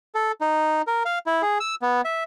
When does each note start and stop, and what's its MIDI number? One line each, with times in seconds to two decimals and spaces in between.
0.15 0.32 69
0.41 0.82 63
0.87 1.03 70
1.05 1.19 77
1.26 1.42 64
1.42 1.58 68
1.60 1.75 88
1.82 2.01 59
2.05 2.24 76